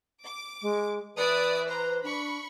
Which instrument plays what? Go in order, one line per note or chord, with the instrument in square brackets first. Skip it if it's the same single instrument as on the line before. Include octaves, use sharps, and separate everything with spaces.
[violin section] D6
[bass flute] G#3
[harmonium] E3 [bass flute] B4 [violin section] D5 E5 D#6
[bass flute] B4 [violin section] C5 A#5
[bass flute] D4 [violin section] B5 C#6